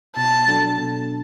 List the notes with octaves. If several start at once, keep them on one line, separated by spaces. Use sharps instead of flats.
B2 A5
F#3 D4 A4
B2